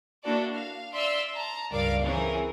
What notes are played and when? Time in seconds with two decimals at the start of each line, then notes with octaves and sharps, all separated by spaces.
0.24 A#3 D4 E4 F#4 A4 D5
0.54 F5
0.92 D5 E5 C6 E6 F6
1.34 A5 A#5
1.71 C#2 G2 A#4 D5 F5 D6
2.02 E3 C4 C#4 G#4 A#4